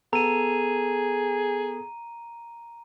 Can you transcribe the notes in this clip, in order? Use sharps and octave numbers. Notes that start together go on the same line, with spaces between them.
B3 G#4 A4 A#5 D#7